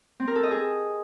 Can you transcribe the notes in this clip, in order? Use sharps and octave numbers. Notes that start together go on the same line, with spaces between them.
C4
A#4
A4
D#5
G#4